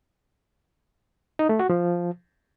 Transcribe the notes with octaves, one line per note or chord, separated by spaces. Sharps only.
D#4
A3
F#4
F3